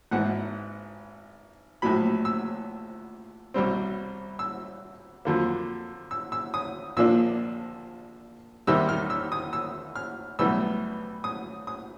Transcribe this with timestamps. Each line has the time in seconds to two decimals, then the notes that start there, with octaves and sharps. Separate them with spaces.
0.11 G#1 G#2 E3 F#5
1.82 A#1 A2 F#3 B5
2.25 E6
3.54 C2 B2 G3 C4
4.39 E6
5.25 F2 D3 F#3 A#3
6.11 E6
6.32 E6
6.54 D#6
6.97 A#1 A#2 F3 A#3 D4 E6
8.67 E2 C3 D#3 G3 E6
8.89 F6
9.10 E6
9.32 D#6
9.53 E6
9.96 F6
10.39 B1 A2 E3 G3 B3 E6
11.24 D#6
11.67 D#6